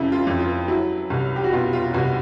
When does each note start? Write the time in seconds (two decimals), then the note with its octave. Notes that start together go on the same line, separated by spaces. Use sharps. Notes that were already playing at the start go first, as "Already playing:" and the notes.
Already playing: F2 C#3 E4
0.12 F4
0.27 F2
0.40 F4
0.68 F#3 E4
1.10 C2
1.36 G4
1.44 F#4
1.52 B2 F4
1.73 F4
1.94 C2 F#4